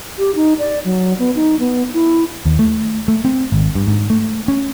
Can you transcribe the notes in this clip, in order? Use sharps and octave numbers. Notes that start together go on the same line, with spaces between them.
G4
D#4
D5
F#3
B3
D#4
B3
E4
D#2
A3
A3
C4
G#1
G2
G#2
A3
C#4